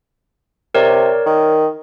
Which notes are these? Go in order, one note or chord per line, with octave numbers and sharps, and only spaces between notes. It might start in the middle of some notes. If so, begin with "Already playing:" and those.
C3 A#4 C#5 D5
D#3